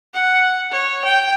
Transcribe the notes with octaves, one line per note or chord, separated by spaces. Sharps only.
F#5
C#5
G5